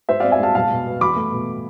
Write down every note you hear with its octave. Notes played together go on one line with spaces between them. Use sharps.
G#2 C5 E5
C4 D5 F5
E5 G#5
G#3 F5 A5
B2 F5 A5
B2
B3
E2 B5 D6
A3
B2